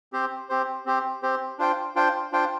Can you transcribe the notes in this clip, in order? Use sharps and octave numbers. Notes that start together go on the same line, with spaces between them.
C4 G4 C5
C4 G4 C5
C4 G4 C5
C4 G4 C5
D4 F4 C5 G5
D4 F4 C5 G5
D4 F4 C5 G5